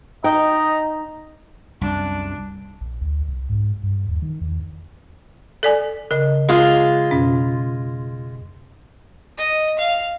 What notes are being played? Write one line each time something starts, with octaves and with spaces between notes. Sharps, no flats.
D#4 D#5 G5 A#5
C2 F#2 D4
A#1
D2
C2
G#2
G2
D#2
D#3
E2
A4 D5 G#5
C#3 A#4 D#5
G#3 F4
F2 B2 C#4
D#5
F5